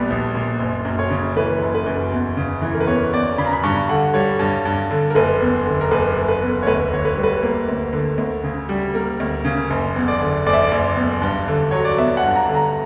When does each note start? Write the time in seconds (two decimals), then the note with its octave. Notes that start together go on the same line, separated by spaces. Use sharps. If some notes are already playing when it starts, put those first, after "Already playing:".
Already playing: A#1 A#2 G3 B3 D5 B5
0.10 A#1
0.35 A#2
0.60 F#1
0.85 F#2
0.99 C#5
1.10 C#3
1.37 E3 B4
1.61 F#1
1.75 B4
1.86 F#2
2.12 E2
2.37 C#3
2.62 E3
2.74 A#4
2.80 B4
2.87 E2 C#5
3.13 E2 D5
3.38 C#3 B5
3.46 A#5
3.53 B5
3.63 G2 C#6
3.89 D3 F#5
4.14 G3 C#5
4.39 G2
4.65 G2
4.91 D3
5.10 A#4
5.15 F#1 B4
5.41 E2
5.66 D3
5.81 A#4
5.91 F#1 B4
6.17 F#1
6.28 B4
6.42 E2
6.63 C#5
6.67 D2 B4
6.93 D3 C#5
7.05 B4
7.17 G3
7.23 B4
7.43 A#3
7.68 D2
7.93 D3
8.18 D2
8.44 C#3
8.69 G3
8.94 A#3 A#4
9.20 D2
9.45 C#3
9.70 F#1
9.96 E2
10.08 D5
10.21 D3
10.46 F#1 D5
10.53 E5
10.62 D5
10.71 F#1
10.96 E2
11.22 G2
11.48 D3
11.71 F#3 C#5
11.85 D5
11.98 B3 E5
12.17 F#5
12.23 G2
12.35 A#5
12.49 D3
12.55 A#5